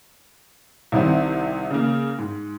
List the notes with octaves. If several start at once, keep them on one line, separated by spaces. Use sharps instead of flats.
C2 C3 D#3 C4
C#3 A#3
G#2